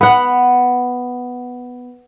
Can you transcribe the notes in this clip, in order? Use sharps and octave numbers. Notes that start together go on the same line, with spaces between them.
B3 F#5